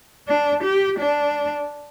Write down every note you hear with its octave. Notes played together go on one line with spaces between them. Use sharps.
D4
G4
D4